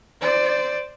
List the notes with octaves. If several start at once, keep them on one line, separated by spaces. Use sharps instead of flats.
C5 D5